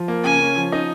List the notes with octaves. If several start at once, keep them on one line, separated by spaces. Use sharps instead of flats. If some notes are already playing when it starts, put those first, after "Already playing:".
Already playing: F3
A#3
C#3 G#5
C#4
F3
D#4